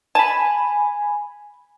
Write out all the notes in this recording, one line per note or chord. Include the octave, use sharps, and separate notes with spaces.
G#5 A5 B5